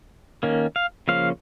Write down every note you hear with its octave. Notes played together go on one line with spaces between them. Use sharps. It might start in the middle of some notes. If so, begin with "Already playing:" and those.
D#3 A#3 C#4
F5
C#3 F3 A#3 C#4 F5